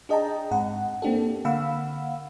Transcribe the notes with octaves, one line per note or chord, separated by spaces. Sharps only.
D4 G#4 D#5 G5 A5 A#5
G#2 C4 F#5
A#3 C4 D4 G4 A4
D3 A#3 F5 F#5 B5 E6